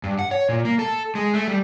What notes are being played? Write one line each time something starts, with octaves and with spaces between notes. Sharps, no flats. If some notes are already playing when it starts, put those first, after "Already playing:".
G2
F#5
C#5
A#2
A#3
A4
G#3
A3
G3